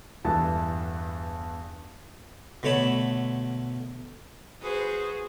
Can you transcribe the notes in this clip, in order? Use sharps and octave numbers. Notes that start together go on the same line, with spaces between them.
E2 G2 E3 D4 A4 A5
B2 D3 A3 C#5 A5 B5
F#4 G#4 B4 C5